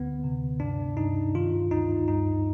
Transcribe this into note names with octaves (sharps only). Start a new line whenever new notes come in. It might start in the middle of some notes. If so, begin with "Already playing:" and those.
Already playing: D2 D3 B3
C3
G2 D4
G2 D#4
D#3 F4
D2 D#4
G2 D#4